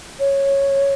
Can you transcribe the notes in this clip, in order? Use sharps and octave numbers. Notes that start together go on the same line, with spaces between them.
C#5